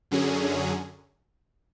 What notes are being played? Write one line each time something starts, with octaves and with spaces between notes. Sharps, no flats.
F#2 D3 F#3 C#4 G#4